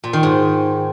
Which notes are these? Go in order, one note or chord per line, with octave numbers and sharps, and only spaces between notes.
A#2
D#3
G#2